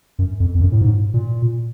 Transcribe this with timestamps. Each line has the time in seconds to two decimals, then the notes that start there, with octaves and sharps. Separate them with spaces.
0.19 F#2
0.40 F2
0.55 F2
0.61 F#2
0.72 A2
0.81 G#2
1.14 A#2